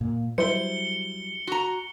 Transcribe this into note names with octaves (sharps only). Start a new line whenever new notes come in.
A#2
F#3 G3 E4 C5 C#7 G7
F#4 A#5